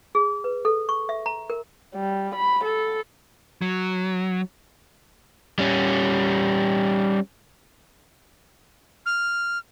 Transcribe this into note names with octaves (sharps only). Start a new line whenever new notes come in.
G#4
B4
A4
C#6
E5
A#5
A#4
G3
B5
A4
F#3
G3 C#4
F6